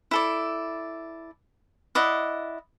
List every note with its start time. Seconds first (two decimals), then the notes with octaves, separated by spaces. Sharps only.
0.11 E4 A4 D5
1.95 E4 D5 D#5 F#5